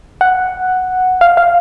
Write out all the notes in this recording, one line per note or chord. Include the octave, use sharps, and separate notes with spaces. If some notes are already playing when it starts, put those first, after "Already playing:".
F#5
F5
F5